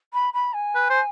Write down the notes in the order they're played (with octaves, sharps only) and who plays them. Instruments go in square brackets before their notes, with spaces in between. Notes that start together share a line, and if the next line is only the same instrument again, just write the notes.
[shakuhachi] B5
B5
G#5
[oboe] B4
C5